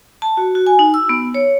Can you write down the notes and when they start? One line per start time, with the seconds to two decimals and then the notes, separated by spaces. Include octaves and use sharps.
0.22 A5
0.37 F#4
0.55 F#4
0.67 G#5
0.79 D#4
0.94 E6
1.09 B3
1.35 C#5